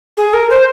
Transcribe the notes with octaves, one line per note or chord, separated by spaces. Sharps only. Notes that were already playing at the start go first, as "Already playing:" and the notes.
G#4
A#4
C5